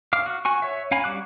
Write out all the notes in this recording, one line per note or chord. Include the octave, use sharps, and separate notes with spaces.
F5 D6 F6
F#4
F#4 G#5 C#6
C#5 E5
C#4 F5 G#5 A#5 B5
G3 F#4 D6 F#6